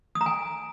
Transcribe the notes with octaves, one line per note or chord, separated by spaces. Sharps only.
D#6
A#5
G#5